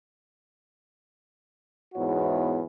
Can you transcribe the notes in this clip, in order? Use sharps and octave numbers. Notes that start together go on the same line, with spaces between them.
E2 G#2 B3 E4 F#4 C#5